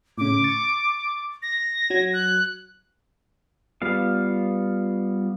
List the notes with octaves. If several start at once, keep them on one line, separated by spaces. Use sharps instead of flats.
A2 C#3 D6
C#6 A6
A#6
F#3 G#6
F#6
G3 B3 F4 F5